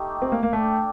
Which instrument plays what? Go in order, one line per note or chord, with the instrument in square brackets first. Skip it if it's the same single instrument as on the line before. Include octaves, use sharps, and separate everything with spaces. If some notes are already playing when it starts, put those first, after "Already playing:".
Already playing: [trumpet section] A3 D#4 G4
[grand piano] C4
A#3
A#3
[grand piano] A3 [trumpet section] D4 A4 D5 G5